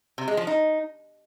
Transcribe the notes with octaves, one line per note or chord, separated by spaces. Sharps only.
C3
G#3
F3
D#4